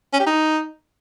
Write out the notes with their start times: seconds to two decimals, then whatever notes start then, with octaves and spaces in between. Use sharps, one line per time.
0.13 C#4
0.20 G4
0.27 D#4